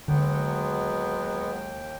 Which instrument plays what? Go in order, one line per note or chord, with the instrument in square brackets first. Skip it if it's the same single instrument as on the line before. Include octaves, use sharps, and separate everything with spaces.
[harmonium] D#2 G5 [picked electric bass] D3 [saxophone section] F#3 G#3 [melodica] B3